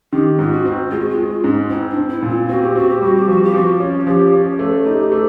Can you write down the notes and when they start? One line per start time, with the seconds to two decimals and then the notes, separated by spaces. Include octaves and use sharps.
0.12 D#3 G4
0.39 G#2 F4
0.52 F#4
0.65 C4
0.91 G#3 F4
1.00 F#4
1.09 F4
1.18 G#3
1.31 F4
1.44 G#2
1.70 C4 E4
1.90 D4
1.96 C4
2.10 E4
2.22 A#2
2.30 F4
2.49 C4 F#4
2.62 G4
2.75 C4 F#4
2.89 G4
3.01 G3 F#4
3.16 G4
3.27 F3 F#4
3.43 G4
3.54 F3 F#4
3.80 C#4
4.07 F3 G4
4.33 C#4
4.59 A3
4.85 D#4 G4
5.12 A3